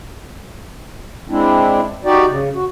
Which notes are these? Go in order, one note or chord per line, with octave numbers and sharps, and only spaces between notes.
G#3 C4 D4 E4
D#4 F#4 G4 D5
C#3
F#4